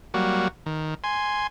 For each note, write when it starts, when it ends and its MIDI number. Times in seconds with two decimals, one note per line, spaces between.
0.14 0.48 54
0.14 0.48 55
0.14 0.48 58
0.14 0.48 66
0.66 0.95 51
1.04 1.47 80
1.04 1.47 84